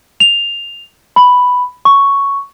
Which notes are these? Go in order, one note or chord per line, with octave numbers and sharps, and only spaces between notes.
F7
B5
C#6